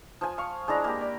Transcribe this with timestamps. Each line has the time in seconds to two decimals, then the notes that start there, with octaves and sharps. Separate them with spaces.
0.21 F3 G#5
0.38 F5 C#6
0.68 G#3 D4 E4 A#5
0.84 A#3 G4
1.01 D5